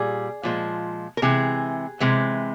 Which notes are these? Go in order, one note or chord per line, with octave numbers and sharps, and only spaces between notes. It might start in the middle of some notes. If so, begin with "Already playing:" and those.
Already playing: A#2 G3 G#4
A#2 F3 G#3
A#4
C3 E3 G#3 G#4
C3 E3 G#3